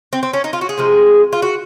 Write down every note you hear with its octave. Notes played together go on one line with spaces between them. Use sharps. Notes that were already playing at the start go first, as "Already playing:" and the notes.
C4
C4
C#4
D#4
F4
F#4
G#4
C3 F3 G#3
F4
F#4